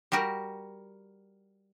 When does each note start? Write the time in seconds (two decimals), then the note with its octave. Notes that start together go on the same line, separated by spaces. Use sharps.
0.12 G3 F#4 G4 A#4